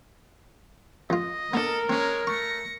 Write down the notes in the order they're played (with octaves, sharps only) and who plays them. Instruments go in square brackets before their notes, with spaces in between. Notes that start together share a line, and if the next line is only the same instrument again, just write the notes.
[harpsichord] F2 F4 [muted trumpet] D#5
[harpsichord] B3 D4 [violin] A4 [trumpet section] A#4
[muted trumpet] G#3 [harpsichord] C4 C#4 [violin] C#5
[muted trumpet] A3 [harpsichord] C#6 [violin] A#6 C#7